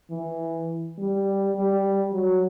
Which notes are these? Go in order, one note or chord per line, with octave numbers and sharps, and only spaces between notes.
E3
G3
G3
F#3